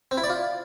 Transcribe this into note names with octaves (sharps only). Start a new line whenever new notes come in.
C4
E4
D5
F4